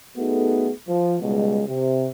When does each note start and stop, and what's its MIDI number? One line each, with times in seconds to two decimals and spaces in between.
0.17 0.70 57
0.17 0.70 59
0.17 0.70 63
0.17 0.70 66
0.17 0.70 68
0.17 0.70 69
0.88 1.16 53
1.21 1.62 37
1.21 1.62 47
1.21 1.62 55
1.21 1.62 56
1.67 2.10 48